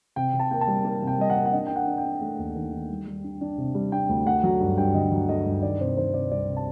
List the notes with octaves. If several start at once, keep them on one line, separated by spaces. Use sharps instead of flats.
C3 G5
C3
A5
A#3 G5
A5
G3
A#3
C3
G5
G3 D#5
F#5
A#3
F#5
D4 D#5
D4 G5
F#5
D4
G5
D4
A3
D#2
D#3
D#3
G3
G3
D4
D4
C3
G3
D4 G5
D2
A3 F#5
F#3
G2
G2 G5
D3 D#5
F#3
A3 D#5
G2
D#3 D5
C3 C5
D#3 C5
C3 D5
C2 D5
C3
A5